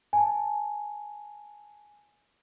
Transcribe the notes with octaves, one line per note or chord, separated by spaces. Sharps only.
G#5 A5